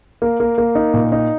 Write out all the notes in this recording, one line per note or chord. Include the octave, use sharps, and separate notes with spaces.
A#3
A#3
A#3
D#4
A#2
D#4